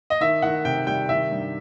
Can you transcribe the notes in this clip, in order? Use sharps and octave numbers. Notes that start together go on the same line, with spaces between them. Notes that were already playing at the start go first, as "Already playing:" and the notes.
D#5
D#3 E5
D#3 F#5
C3 G5
G3 G5
D#3 E5
G2